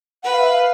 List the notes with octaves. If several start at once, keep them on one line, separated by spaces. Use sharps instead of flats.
B4 F#5
F5
E5
F5